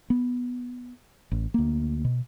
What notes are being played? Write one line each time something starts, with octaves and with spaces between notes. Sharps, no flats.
B3
A1
D2 A#3
B2